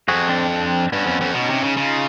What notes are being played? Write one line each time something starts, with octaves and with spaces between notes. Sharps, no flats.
F2 F#4 G#4
C4 D4
C4 D4
G2 B3 C#4
F2
F2
B2 C#4 D#4
C3
C#3
C#3 D#4 F4